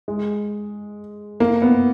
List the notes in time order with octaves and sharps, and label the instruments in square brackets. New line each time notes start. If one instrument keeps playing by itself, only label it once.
[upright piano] G#3
A#3
B3